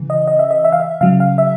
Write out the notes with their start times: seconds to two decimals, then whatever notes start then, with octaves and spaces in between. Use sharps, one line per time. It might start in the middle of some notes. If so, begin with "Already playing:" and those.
Already playing: C#3 E3
0.10 D#5
0.27 D#5
0.39 E5
0.51 D#5
0.64 E5
0.72 F5
0.80 E5
1.01 C#3 F#3 F5
1.20 F5
1.38 E5